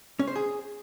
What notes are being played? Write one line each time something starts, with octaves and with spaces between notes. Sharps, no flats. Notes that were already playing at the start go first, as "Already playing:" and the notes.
C#4
C5
G#4